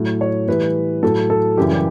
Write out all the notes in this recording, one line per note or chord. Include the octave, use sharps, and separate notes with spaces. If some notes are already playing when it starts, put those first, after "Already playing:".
Already playing: A2 F#3
C#5
A2 E3 G3 B4
A2 F#3 A4
A4
F#2 C#3 E3 G3 G4
G4